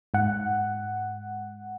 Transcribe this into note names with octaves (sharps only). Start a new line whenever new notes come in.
G#2 F#5